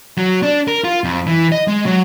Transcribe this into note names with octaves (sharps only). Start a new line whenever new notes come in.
F#3
D4
A#4
F4
F2
E3
D#5
G#3
F#3